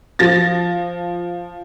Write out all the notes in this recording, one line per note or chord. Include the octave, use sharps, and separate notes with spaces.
F3 A6 A#6